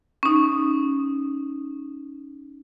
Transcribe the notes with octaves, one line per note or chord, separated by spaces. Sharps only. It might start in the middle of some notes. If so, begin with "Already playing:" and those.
C#4 D#4